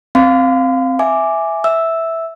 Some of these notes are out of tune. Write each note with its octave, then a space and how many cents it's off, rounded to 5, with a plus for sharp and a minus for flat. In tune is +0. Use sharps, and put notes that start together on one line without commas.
C4 +0 F5 +0 C6 -40
E5 +0 G#5 +0 D6 +0
E5 -5 E6 +0